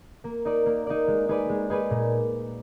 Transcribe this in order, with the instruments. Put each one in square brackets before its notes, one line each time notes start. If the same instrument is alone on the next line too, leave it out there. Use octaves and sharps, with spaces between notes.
[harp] A#3
D#4 A#4 D5
A#3
D#4 A#4 D5
G#3
D#4 G#4 B4 D5
G#3
D#4 G#4 B4 D5
A#2